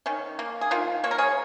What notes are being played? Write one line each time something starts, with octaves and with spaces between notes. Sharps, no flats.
D#3 C#4
A#3
G#4
D#3 F4 A#4
A#3 C#5
A#4
G#4 C#5